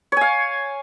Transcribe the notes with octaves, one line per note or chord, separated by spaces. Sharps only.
C#5 F5 G#5